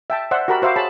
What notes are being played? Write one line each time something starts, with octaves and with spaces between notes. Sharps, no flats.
E5 G5 A5
C5 D5 E5 F#5 C6 E6
F#4 G4 A#4 A5 B5 D6
F#4 C5 E5 F5 B5 D6
G#4 C#5 A5 B5